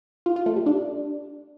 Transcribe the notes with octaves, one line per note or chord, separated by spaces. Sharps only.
F4
F4
A3
G3
D4